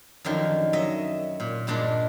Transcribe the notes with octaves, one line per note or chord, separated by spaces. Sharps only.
F#2 D3 D#3 F3
F#3 D#5 E5
A#2
G2 A#2 G#3 D4